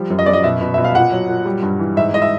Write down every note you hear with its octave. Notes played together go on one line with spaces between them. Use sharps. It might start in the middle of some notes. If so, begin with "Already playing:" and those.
Already playing: F3 G3
F#2
D#5
F#2 D5
D#5
B2 E5
B2
B2 E5
F5
A#2 F#5
F#3
A#2
G3
G2
E3
G#2 E5
G#2 D#5
E5